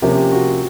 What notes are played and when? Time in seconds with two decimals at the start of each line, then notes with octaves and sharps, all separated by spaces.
0.02 C3 F3 A#3 C#4 G4
0.32 F#4